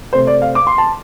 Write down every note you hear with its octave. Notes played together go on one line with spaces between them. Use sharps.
C3 A3 C4 C5
D5
F5
D6
C6
A5